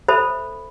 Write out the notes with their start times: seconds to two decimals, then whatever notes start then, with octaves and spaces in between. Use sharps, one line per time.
0.08 A4 C5 E5 B5